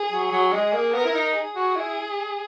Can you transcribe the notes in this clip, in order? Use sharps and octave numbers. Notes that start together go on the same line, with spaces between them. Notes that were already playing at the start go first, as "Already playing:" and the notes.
Already playing: G#4
F#3
F#3
G#3 G#4
A#3
B3 A#4
E4
D#4
G#4
F#4
E4